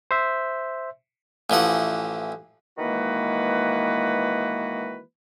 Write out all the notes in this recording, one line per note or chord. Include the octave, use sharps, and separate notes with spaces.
C5 E5
A1 E3 F3 F#5
D#3 E3 G#3 A#3 F#4 B4